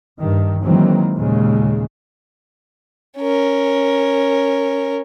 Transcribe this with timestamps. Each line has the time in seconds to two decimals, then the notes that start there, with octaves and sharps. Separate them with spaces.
0.19 G2 D#3
0.62 D#3 E3 F#3 G#3 A#3 C4
1.17 D#2 A#2 C#3 G#3
3.18 C#4 A#4